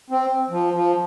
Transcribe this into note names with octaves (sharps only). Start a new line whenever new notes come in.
C4
F3
F3